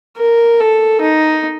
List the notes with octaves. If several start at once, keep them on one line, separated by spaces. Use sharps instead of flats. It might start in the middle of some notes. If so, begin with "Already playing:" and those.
A#4
A4
D#4